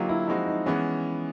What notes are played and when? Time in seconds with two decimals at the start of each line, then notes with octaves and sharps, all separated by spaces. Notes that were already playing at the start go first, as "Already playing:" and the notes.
Already playing: D3 F#3 A#3 D#4 F4 G4
0.09 E4
0.28 F3 G#3 C4 D#4 E4 F#4
0.47 D#4
0.66 E3 G#3 B3 C#4